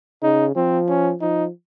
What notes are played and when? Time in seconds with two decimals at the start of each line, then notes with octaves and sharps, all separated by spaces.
0.22 C#3 D#4
0.56 F3 C4
0.89 C#4
1.21 F3 D#4